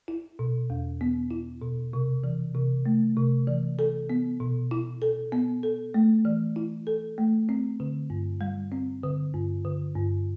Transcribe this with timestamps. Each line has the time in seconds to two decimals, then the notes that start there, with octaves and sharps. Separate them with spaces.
0.08 E4
0.39 B2
0.70 E2
1.01 B3
1.31 E4
1.62 B2
1.93 C3
2.24 E3
2.55 C3
2.86 A3
3.17 C3
3.47 E3
3.79 A4
4.10 B3
4.40 B2
4.71 E4
5.02 A4
5.32 B3
5.63 A4
5.94 A3
6.25 E3
6.56 E4
6.87 A4
7.18 A3
7.49 C4
7.80 D3
8.10 G2
8.41 G3
8.72 C4
9.03 D3
9.34 G2
9.65 D3
9.95 G2